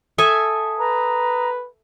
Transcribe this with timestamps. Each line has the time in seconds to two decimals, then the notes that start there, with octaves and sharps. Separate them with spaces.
0.18 A4 E5 G#5 D#6
0.79 B4 A#5